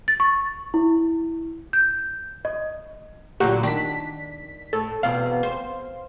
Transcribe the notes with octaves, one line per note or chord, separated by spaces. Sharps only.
A6
C#6
E4
G6
D#5
A#2 D3 F#3 F#4 G4
D#3 D4 B6
A2 A4
E2 B2 C4 F5
C5